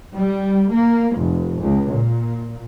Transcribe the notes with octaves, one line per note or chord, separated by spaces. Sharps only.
G3
A#3
F1
C#2
A#2